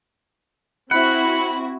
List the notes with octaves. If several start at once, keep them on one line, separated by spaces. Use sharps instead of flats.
C4 E4 F#4 F#5 B5